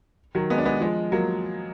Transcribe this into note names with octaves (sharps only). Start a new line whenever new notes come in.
D#3 F#3
G#3 B3
D4
G#3 B3
F3 G#3
F#3 A#3